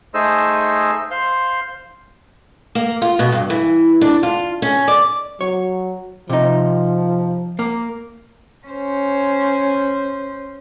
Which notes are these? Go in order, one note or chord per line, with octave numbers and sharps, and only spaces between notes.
A3 D#4 G#4 C5 D#5 E6
C5 F5 C6
A#3
F4
B2
G2
E3
D4
F4
C#4
D5
F#3 C#5
C3 F3 D#4
A#3
C#4 C5